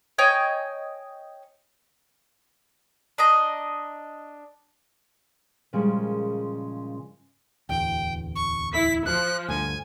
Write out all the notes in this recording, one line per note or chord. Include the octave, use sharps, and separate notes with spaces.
C#5 D#5 G5 G#5
D4 D#5 A#5
A#2 C#3 F3 G3 G#3 A#3
D1 E2 G5
C#6
E4 B6
F3 F#6
D2 G2 D3 G#5